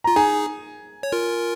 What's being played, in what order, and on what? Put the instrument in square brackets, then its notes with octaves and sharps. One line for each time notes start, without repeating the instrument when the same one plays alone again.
[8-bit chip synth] F4 [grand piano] A#5
[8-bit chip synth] D#4 G#4 [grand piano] G#5
[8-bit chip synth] C#5
F4 A#4